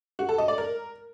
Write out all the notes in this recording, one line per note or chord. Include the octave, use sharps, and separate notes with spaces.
F#4
A4
D#5
D5
A#4